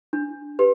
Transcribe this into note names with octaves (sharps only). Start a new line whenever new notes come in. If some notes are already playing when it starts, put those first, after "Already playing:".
D4
G4 B4